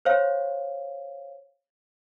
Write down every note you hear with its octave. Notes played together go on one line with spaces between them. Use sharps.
C5 C#5 F5